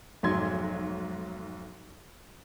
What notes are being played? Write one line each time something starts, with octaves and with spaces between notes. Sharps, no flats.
F1 B1 G#2 F#3 C6 G#6